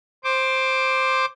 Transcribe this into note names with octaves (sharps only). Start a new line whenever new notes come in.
C5 D6